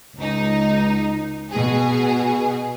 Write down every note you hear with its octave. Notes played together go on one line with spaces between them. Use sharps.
C#2 D#4
B2 G#4